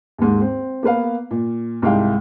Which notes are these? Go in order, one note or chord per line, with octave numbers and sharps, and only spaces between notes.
D#2 G#2
C4
A#3 B3 B4 F5
A#2
C2 G#2 D#4 E4 F5 G5